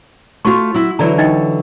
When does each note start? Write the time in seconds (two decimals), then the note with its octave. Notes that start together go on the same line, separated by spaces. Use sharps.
0.45 A3 F4 F#4 C6 C#6
0.74 F#3 E4
0.99 D3 E3 F#3 D5 A#5
1.18 D#4 D#5 G5